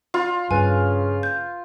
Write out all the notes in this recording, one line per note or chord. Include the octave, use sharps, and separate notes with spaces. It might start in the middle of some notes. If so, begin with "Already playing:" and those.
F4
G2 C#3 B4 G#5
G6